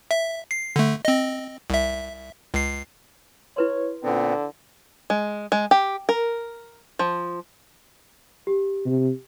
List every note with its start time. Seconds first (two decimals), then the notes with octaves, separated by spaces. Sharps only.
0.11 E5
0.51 C7
0.76 D3 A3
1.05 C4 D#5
1.70 C2 E5
2.54 C#2 C7
3.57 E4 B4 C#5 C6
4.04 A#2 D3 B3 C4
5.10 G#3
5.52 G#3
5.71 G4
6.09 A#4
6.99 F3
8.47 G4
8.85 C3